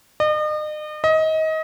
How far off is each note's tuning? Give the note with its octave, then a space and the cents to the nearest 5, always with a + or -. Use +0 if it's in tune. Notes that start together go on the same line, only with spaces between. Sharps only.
D#5 -40
D#5 +25